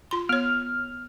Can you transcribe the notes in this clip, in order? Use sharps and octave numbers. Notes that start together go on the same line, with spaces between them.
F4 C6
B3 C#5 F6